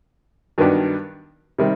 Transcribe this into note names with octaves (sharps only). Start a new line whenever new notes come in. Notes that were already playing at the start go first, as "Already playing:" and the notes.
G2 D#3 F#3 B3 D4
C3 D#3 G3